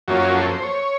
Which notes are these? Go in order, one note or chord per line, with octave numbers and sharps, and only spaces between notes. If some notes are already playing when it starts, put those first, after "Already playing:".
F#2 F3 A#3 C#4 F#4
F#4
A4
C5
C#5